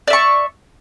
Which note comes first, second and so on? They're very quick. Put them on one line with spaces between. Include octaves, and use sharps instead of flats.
D5 E5 C#6